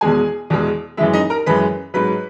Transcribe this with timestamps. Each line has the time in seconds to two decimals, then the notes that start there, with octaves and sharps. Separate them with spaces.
0.01 E2 B2 G#3 G#4 G#5
0.50 E2 B2 G#3
0.97 F#2 E3 G#3 E4 E5
1.13 D#4 D#5
1.30 A#4 A#5
1.46 F#2 E3 G#3 B4 B5
1.94 G#2 F#3 B4 B5